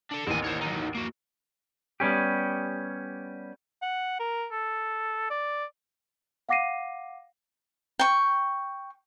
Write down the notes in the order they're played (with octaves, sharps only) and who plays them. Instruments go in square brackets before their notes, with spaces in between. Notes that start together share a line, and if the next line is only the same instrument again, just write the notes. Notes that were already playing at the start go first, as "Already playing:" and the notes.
[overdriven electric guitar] D4 A4
[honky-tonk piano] A1 D#2 [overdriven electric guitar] C4 G#5
[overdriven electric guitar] C5 C#5
F#3 D#4
A#3 F#4
[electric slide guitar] G3 B3 C#4 G4
[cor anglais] F#5
A#4
A4
D5
[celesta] F5 F#5 D6 A#6 C7 D#7
[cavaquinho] G5 C#6